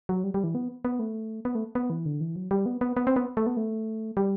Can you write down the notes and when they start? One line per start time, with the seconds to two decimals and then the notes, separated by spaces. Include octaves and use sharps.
0.09 F#3
0.24 G3
0.34 G3
0.44 E3
0.55 B3
0.85 B3
0.99 A3
1.45 B3
1.55 A3
1.75 B3
1.90 E3
2.06 D3
2.21 E3
2.36 F#3
2.51 G3
2.66 B3
2.81 B3
2.97 B3
3.07 C4
3.16 B3
3.37 A3
3.47 B3
3.57 A3
4.17 G3